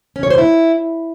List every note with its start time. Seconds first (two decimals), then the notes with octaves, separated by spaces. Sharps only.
0.16 C#4
0.23 C#5
0.30 C5
0.38 E4